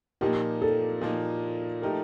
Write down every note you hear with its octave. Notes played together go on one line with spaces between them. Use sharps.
A#2 F3 A#3 D#4 G4
A4
A#2 F3 A#3 D#4
F3 A3 D#4 G4 A#4